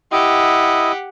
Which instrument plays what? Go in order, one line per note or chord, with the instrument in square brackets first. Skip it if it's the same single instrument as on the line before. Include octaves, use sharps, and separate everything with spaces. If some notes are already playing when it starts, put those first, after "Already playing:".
[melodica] E4 D#5 [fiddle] G4 F#5